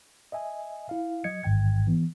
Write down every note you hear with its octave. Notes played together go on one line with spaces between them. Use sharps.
D#5 E5 G#5
E4 F5
F#3 D#5 G#6 C#7
A1 G#2 D#3 G5 G#6
E3 B3